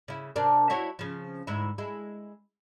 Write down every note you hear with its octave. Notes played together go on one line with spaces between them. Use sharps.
C#3 E4
C3 D4 A#4
E4 F#4 C#5
C#3 F3
D2 G#2 E4
G#3 E4